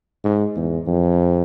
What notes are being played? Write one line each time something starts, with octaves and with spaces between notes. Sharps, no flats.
G#2
E2
F2